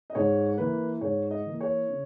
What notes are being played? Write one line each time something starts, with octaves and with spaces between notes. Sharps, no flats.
D#5
G#2 C#5
E3 A#3 B4
G#2 C#5
D#5
E3 A#3
C#5
C#3